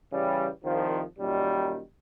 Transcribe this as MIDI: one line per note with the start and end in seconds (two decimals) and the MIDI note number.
0.11 0.47 49
0.11 0.47 52
0.11 0.47 55
0.62 1.01 36
0.62 1.01 51
0.62 1.01 53
1.17 1.79 42
1.17 1.79 46
1.17 1.79 51
1.17 1.79 55